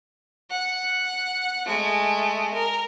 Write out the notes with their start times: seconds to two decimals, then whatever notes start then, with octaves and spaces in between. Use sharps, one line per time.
0.50 F#5
1.66 G#3 A3
2.54 A#4